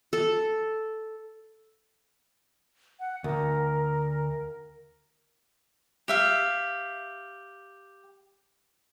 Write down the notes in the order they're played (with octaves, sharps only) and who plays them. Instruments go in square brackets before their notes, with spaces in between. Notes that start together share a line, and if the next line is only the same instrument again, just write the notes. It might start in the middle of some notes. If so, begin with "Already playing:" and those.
[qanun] A4
[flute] F#5
[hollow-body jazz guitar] D2 [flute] A#4
[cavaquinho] G4 E5 F5